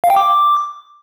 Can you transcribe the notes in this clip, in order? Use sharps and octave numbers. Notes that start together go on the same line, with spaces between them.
F5
G5
D6